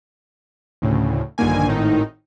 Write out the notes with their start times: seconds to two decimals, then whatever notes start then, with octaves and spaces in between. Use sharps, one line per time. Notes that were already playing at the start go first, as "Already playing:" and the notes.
0.82 D2 A2 C#3
1.38 A#1 G2 D3 D#3 A#3 G#5
1.67 G#1 A2 D#3 D#4